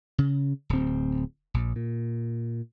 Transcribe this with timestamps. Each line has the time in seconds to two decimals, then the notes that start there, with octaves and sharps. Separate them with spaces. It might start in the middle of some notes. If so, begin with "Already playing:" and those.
0.18 C#3
0.69 D1 C4
1.54 A#1
1.76 A#2